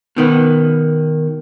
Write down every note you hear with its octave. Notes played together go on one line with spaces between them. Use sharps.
B2 D#3 B3